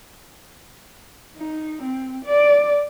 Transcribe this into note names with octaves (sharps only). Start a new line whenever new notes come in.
D#4
C4
D5